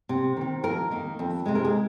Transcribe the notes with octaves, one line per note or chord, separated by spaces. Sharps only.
C3
D#3 C4
F2 A#4
D#3 A#3
F2
C3 G#3
A#4
G#4